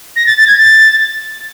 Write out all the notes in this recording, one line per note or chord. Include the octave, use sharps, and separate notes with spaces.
A#6
A6
A6
G#6
A6